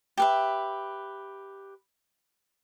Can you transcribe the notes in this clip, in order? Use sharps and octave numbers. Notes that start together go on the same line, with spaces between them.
G4 B4 E5